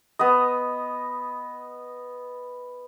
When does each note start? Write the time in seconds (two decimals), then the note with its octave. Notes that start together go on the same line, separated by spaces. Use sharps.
0.19 B3 D#5